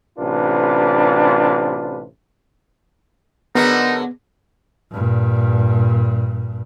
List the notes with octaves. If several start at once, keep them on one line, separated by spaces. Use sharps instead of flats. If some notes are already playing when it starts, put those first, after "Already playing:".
A1 C3 D4 F4 B4
D3 F#3 G#3 B3 D#4 A#4 B4 F#5
G2 A#2